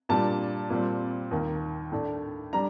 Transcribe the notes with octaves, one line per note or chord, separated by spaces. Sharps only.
A#2 G3 D4 A5
A#2 G3 C4
D#2 D#3 A#3
A2 A3 D4
G3 D4 A#5